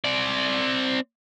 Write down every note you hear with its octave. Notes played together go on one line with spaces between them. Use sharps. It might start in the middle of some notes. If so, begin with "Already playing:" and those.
C4 D5